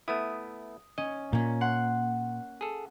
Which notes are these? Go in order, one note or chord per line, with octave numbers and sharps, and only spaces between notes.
A3 B3 E4 D#6
C#4 D#5
A#2 A#3 C#4
F#5 C6
G#4 A4